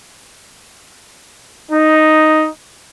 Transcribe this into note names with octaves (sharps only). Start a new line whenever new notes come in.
D#4